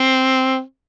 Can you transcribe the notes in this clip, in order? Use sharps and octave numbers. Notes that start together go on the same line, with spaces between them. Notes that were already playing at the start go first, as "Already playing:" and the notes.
Already playing: C4